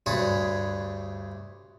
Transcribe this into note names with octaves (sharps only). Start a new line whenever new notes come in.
D2 G2 G#4 B4 C#5 B5